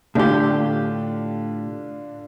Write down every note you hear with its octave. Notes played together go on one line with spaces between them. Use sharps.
A2 D3 D4 F4 G4